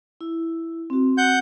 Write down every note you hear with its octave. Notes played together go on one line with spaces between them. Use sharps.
E4
C4 F#4
F#5 G6